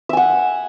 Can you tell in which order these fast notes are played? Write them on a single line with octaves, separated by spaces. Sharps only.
E5 G#5 F#5